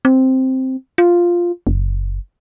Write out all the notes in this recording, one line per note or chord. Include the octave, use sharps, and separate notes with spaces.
C4
F4
F#1